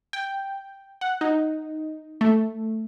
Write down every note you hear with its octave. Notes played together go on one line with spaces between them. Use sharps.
G5
F#5
D#4
A3